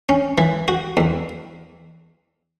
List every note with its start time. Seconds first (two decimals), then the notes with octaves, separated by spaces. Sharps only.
0.09 C#4
0.38 E3
0.68 F#4
0.97 E2